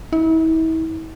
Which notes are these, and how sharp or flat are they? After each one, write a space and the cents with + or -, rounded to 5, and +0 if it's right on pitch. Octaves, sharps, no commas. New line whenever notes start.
E4 -40